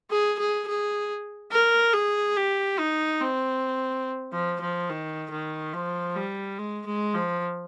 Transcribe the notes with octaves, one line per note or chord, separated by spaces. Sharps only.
G#4
G#4
G#4
A#4
G#4
G4
D#4
C4
F3
F3
D#3
D#3
F3
G3
G#3
G#3
F3